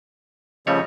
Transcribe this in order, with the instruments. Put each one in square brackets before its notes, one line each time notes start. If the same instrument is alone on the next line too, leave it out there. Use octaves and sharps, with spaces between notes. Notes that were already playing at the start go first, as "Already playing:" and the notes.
[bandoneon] C#3 F3 [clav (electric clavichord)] G3 A3 C#5 [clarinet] D#5